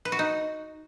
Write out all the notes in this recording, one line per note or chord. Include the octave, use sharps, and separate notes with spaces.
B4
F#4
D#4